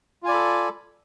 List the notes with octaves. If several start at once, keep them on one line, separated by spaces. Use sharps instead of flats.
F4 A4 D5 G#5 B5